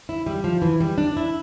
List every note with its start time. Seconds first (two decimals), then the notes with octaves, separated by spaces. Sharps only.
0.09 E4
0.26 G3
0.44 F3
0.62 E3
0.80 G3
0.98 D4
1.17 E4